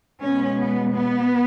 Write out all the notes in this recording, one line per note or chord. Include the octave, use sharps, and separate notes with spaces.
B2 G#3 B3 C#4
B3
B3